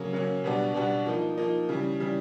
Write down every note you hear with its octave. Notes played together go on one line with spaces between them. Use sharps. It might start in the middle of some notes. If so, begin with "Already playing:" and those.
Already playing: C#3 F#3 A#3 C#4
C#3 F#3 A#3 C#4
B2 G3 B3 D4 F#4
B2 G3 B3 D4 F#4
F3 A#3 D#4
F3 A#3 D#4
C#3 E3 G3
C#3 E3 G3